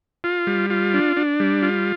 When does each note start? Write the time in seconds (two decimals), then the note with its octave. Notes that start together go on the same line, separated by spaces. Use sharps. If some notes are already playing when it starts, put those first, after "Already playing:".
0.24 F4
0.47 G3
0.70 F4
0.94 D4
1.17 D4
1.40 G3
1.62 F4